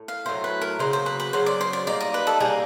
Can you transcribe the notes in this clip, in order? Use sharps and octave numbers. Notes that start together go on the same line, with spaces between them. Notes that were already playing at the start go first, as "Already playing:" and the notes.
Already playing: A2
F5
A2 F#3 A3 C5
B4
A#4
C#3 F#3 A#3 C5
C5
B4
B4
C#3 F#3 A#3 C5
D5
C5
D5
G3 A#3 D#4 D5
D#5
B4
A4
G3 A#3 D#4 G#4